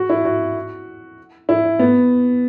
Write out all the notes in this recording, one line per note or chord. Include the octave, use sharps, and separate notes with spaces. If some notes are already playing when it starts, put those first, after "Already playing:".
Already playing: F#4
E4
F#4
E4
B3